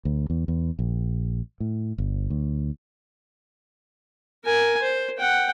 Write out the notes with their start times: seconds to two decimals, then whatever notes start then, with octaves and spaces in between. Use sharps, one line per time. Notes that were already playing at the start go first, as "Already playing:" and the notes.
0.05 D2
0.30 E2
0.48 E2
0.79 A#1
1.60 A2
1.98 G1
2.30 D2
4.45 A#4 G#5
4.82 C5
5.18 F#5 G5